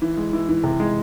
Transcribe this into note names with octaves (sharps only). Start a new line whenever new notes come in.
E3
G#3
E3
E3
C3
G#3